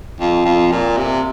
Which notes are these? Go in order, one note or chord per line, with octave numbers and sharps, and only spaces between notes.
F2
F2
A#2
C3